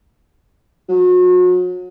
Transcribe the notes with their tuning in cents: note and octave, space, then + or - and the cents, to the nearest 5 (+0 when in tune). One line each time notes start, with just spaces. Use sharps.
F#3 -35